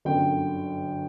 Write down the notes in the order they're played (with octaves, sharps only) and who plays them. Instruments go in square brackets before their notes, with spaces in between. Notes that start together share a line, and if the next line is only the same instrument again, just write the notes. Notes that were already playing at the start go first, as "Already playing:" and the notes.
[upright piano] G1 F#2 D3 G5